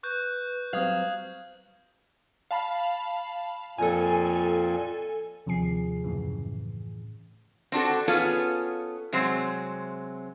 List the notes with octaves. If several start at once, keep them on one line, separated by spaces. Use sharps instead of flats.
B4 C#6 F#6 G6
F#3 G3 C4 F5 D#6 G#6 F#7
F5 A5 B5
F2 A#2 A4 G#5
D#2 C3 F3 G#4 C7
F#2 A2 C#3 E3
C4 D4 F#4 A4
B3 C#4 F4 G#4 A4
C3 F#3 G#3 C4